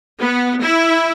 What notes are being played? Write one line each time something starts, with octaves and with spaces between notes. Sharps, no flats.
B3
E4